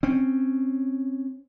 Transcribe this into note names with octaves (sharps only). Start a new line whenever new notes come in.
C4 C#4